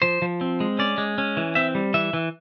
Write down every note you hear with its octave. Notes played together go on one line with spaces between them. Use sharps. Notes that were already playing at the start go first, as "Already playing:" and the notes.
F3 C5
F3
C4
G#3
C#4 D5
G#3
C#4
E3
C4 E5
G3
E3 E5
E3